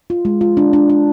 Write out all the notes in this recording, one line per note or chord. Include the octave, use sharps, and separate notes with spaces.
F4
G#3
F4
D4
D4
D4